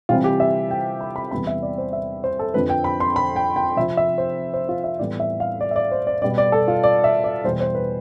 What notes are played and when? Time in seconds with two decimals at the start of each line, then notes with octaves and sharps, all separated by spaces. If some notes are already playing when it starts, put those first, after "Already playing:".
0.09 C3 E3 G3 C4 F4
0.24 G4
0.40 E5
0.71 G5
1.01 B5
1.16 B5
1.31 E2 C3 G3 B3 B5
1.47 E5
1.63 D5
1.78 C5
1.93 E5
2.24 C5
2.39 A4
2.54 F2 D3 F3 C4 B4
2.69 G5
2.84 B5
3.00 C6
3.16 B5
3.36 G5
3.56 G5
3.77 C3 F3 C4 E5
3.97 E5
4.18 C5
4.54 C5
4.69 F4
4.84 E5
4.99 A2 E3 G3 B3 D5
5.20 E5
5.40 F5
5.61 D5
5.71 E5
5.76 D5
5.92 C5
6.07 D5
6.22 B2 G3 B3 D5
6.38 D5
6.52 A4
6.68 F4
6.83 D5
7.04 E5
7.24 D5
7.44 E2 B2 G3 C5
7.61 C5
7.75 B4